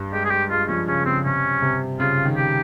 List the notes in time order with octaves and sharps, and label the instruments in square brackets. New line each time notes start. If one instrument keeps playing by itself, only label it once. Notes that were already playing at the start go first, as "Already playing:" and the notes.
Already playing: [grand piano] G2
[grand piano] G#3 [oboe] G4
[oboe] G#4
[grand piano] G#3 [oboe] G4
[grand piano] G#3 [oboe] F4
[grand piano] F3 [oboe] C#4
[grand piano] C#3 [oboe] C#4
[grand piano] C#3 [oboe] C4
[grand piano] C3 [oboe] C#4
[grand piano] C3
[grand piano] C#3 [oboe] F4
[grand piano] D#3
[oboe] G4